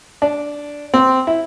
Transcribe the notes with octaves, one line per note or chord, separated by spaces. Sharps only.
D4
C4
E4